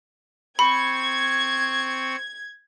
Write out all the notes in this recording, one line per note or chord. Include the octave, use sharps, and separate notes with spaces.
C4 B5 C#6 G#6